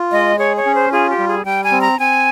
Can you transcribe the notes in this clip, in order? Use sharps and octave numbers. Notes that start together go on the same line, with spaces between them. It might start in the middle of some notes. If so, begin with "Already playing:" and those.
Already playing: F4
G#3 D#5
G#4 C#5
C#5
C#4
C5
F4 G#4
G4
G3
G#4
G3 G5
G#5
C4
A#5
C4 G#5